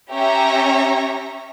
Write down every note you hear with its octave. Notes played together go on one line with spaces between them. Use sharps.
C#4 G4 C#5 E5 A#5